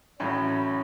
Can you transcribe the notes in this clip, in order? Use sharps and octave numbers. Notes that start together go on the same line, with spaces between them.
A1 A2 F#3 C#4 E4 C#5